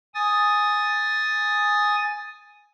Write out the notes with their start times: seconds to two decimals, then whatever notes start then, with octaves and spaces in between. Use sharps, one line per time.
0.14 G#5 D#6 A6